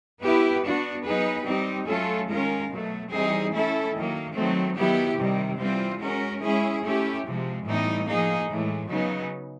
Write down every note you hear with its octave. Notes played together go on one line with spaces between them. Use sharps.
B3 E4 G4 B4
B3 D4 F#4
F#3 B3 D#4 G#4 B4
G3 C4 D#4 G4
F#3 A3 C#4 F4 A4
D#3 G#3 C#4 F4 A#4
B2 F#3 A3
E3 G3 C4 D#4 G#4
A3 C#4 E4 A4
D#3 F#3 A#3
D#3 F#3 A3 C4
D#3 F#3 B3 E4 G4
C3 D#3 G3
E3 G3 C4 F4
G#3 C#4 F#4 A#4
G#3 C#4 E4 G#4
A3 C#4 E4 G4
C3 F3 G#3
A2 E3 G3 B3 D#4
F3 A#3 D#4 G#4
A2 E3 G#3
C#3 F#3 B3 D#4